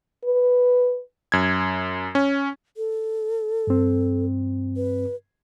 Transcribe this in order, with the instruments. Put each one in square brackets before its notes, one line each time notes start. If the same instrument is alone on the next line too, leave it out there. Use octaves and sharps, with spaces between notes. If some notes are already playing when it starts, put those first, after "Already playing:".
[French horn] B4
[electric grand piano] F#2 G#6
C#4
[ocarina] A4
[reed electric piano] G2 C4
[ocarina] B4